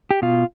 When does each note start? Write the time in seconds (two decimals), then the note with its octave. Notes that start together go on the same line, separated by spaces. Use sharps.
0.11 G4
0.22 B2 F4